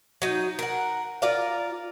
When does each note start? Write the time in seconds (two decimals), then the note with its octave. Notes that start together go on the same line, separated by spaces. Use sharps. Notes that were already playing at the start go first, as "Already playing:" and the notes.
0.22 F#3 D#4
0.59 A#4 F#5
1.22 F4 A#4 D5 F5